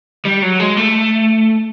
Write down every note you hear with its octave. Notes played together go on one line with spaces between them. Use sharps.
G3
F#3
G#3
A3